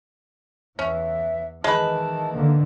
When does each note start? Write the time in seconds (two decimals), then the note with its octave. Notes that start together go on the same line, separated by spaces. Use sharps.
0.79 E2 E3 C#4 E5
1.64 D#3 E3 G#3 B4 A5
2.33 D3 A#3